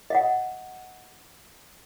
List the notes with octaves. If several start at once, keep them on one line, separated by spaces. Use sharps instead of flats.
D#5 F5 F#5